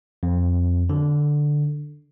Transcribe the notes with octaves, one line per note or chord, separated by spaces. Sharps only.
F2
D3